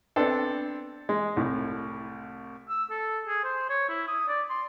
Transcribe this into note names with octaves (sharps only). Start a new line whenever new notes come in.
B3 C4 D4 A4
G#3
C2 A2
E6
A4
G#4
C5
C#5
E4
D#6
D5
C6